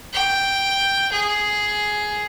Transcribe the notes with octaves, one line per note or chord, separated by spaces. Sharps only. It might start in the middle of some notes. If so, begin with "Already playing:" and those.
G5
G#4